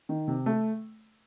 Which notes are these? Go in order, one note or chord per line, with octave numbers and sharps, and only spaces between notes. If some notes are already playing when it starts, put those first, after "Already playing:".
D#3
C3
A3